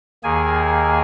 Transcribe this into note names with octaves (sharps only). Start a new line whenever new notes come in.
D#2 D#3 A#3 G#4 G#5